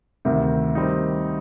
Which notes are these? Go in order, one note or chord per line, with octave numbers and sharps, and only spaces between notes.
D2 C3 D#3
D#3 G3 C4 D#4